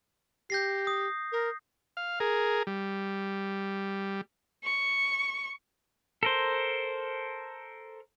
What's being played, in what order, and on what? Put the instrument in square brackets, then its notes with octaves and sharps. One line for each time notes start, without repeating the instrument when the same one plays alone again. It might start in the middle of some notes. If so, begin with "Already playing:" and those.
[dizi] G4 [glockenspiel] G6 A#6 C7
[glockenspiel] D#6
[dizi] A#4
[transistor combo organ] F5
G#4 A#4
G3
[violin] C#6
[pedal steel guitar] A4 A#4 C5